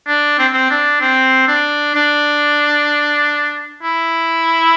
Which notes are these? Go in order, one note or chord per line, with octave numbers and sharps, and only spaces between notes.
D4
C4
C4
D4
C4
D4
D4
E4